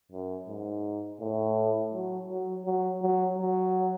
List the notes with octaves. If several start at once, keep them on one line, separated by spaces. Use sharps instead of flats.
F#2
G#2
A2
F#3
F#3
F#3
F#3
F#3